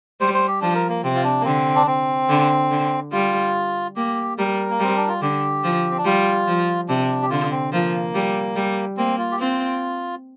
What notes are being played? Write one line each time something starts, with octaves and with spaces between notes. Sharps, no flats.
G3 C5
C5
G4
F3 D4
A#4
A#3
C3 C4
F4
D4
A#3
D3 C4
D4
C4
D3
D3
G3 F4
A#3 G4
G3 A#4
A#3
G3 C4
D4
F4
D3 G4
F3
C4
D4
G3 F4
F3
C3 D4
G4
D3 F4
C4
F3 A#3
G3
G3
A#3 C4
F4
G4
C4 F4